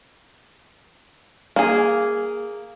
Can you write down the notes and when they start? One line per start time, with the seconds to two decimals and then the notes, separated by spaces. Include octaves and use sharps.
1.56 A#3 G#4